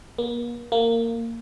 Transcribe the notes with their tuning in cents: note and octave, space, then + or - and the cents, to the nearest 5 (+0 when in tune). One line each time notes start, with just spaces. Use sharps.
A#3 +40
A#3 -20